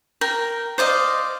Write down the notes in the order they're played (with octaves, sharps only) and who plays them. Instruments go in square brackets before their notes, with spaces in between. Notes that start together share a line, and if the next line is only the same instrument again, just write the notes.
[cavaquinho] A#4 G5
C5 D5 D#5 F5